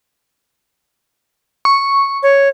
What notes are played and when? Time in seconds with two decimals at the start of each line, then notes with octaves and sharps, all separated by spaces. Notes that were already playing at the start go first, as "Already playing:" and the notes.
1.65 C#6
2.23 C#5